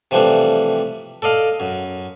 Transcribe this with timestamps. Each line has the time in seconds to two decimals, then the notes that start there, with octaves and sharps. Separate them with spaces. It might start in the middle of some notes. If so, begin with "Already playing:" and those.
0.11 C3 E3 F3 G3 A3 D4
1.22 A4 D5 D#5 F5
1.60 F#2